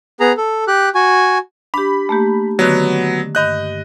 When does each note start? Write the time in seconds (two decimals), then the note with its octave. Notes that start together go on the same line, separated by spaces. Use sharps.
0.20 B3 G#4 A#5
0.37 A4
0.68 G4 F#6
0.95 F#4 G#5
1.74 D4 G4 B5
2.09 A3 A#3 G4
2.59 D3 D#3 F#3 B3
3.35 G2 D#5 F#6 G6